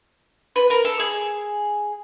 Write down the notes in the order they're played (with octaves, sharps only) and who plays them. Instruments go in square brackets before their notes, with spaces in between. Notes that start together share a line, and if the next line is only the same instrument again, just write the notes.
[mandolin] B4
A#4
A4
G#4